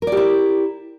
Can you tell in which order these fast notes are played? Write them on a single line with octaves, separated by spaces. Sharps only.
A#4 D5 G4 E4